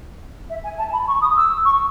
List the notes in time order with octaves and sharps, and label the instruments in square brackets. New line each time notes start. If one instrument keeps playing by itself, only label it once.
[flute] E5
G#5
A5
B5
C#6
D#6
E6
C#6